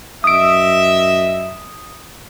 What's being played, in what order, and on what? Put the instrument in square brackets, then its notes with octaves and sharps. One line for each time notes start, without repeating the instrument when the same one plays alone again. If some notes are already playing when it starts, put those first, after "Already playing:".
[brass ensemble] F#2 D#5 E5 [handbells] D#6 D7